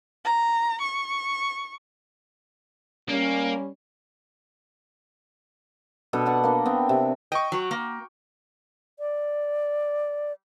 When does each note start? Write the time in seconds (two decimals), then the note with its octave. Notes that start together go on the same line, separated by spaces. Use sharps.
0.25 A#5
0.81 C#6
3.09 G3 A#3 C#4
6.13 B2 D4 A4 B5
6.26 B4 D5 F#5 C#6
6.44 A#3 D4
6.66 B3 C4 G5
6.89 C3
7.32 D#5 G5 C#6
7.52 F#3
7.71 A#3
8.98 D5